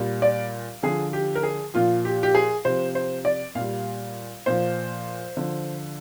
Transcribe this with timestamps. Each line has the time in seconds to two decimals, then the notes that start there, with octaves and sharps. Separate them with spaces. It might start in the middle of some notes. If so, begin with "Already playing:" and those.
Already playing: A#2 G3
0.22 D5
0.83 D3 F3 G#4
1.13 G4
1.35 A#4
1.43 G#4
1.74 A#2 F3 F4
2.05 G4
2.23 G4
2.35 G#4
2.65 C3 F3 C5
2.95 C5
3.25 D5
3.55 A#2 F5
3.61 G3
4.46 A#2 F3 C5
5.37 D3 F3